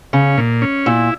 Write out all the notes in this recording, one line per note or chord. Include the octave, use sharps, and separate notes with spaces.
C#3 C#4
A#2
C#4
A#2 E4